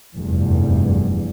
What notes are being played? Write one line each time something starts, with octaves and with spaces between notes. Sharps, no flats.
F1 E2 G2